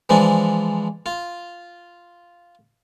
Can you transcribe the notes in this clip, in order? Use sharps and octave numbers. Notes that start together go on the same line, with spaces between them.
E3 F3 G#3 D4
F4